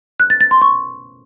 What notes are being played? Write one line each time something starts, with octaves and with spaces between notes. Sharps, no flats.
F#6
A6
A6
C6
C#6